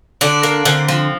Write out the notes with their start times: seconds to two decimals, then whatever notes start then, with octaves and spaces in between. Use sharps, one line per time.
0.21 D3 D4
0.43 A#3
0.65 D3 C4
0.88 F3